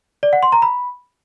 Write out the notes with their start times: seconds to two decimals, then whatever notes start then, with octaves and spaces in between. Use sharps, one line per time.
0.23 D5
0.33 F#5
0.43 C6
0.52 A#5
0.62 B5